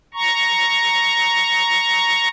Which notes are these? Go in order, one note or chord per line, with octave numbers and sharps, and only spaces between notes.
A#5 C#6